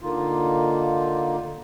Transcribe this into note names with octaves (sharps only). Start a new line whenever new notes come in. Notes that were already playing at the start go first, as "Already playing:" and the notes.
D3 A#3 D#4 F4